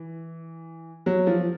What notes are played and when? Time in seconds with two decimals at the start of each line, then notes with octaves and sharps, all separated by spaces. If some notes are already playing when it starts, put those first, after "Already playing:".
Already playing: E3
1.06 F#3
1.27 F3